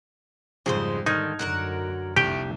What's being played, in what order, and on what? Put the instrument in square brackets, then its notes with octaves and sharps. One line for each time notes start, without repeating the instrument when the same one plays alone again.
[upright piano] F2 [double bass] G#2 G3 [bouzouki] C#3 G#3 C5
[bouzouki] D3 D#3 [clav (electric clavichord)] D#4 [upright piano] F6 G#6
[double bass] F#2 D3 [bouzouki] F#4 A#4 F#5
[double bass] F1 [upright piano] C2 [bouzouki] A3 [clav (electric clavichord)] G4 G5